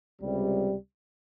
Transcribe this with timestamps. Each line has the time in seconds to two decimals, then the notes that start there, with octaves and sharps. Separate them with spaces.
0.21 C#2 C3 G3